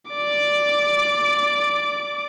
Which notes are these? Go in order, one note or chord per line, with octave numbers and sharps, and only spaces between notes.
D5 D6